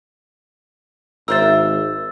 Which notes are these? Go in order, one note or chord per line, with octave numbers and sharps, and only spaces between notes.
G#1 A#3 C5 E5 E6 A6